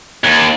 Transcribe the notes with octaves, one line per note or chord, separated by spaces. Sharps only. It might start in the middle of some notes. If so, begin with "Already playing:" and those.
D#2